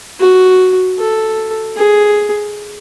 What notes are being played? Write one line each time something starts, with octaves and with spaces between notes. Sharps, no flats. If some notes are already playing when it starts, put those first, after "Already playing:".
F#4
A4
G#4